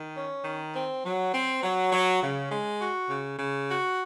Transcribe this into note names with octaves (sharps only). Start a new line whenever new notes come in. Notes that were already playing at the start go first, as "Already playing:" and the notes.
Already playing: D#3
C#4
D#3
C4
F#3
C4
F#3
F#3
C#3
G#3
F#4
C#3
C#3
F#4